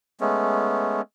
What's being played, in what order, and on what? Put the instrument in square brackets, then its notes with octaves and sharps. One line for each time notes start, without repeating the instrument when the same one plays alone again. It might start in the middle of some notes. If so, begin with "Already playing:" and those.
[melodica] G#3 A3 B3 C#4